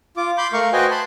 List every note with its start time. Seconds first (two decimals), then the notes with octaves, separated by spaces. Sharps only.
0.17 F4 D6
0.38 B5 C6 D6 G6
0.53 A3 A#4 F5 C#6
0.73 F#4 B4 C5 D#5 G5 G#5
0.91 A5 B5 C6